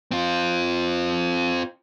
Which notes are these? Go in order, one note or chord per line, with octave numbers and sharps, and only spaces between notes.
C4 F4